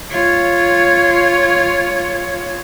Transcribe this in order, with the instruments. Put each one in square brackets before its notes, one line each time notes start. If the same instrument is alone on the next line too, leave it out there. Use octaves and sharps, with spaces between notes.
[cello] F4 C#5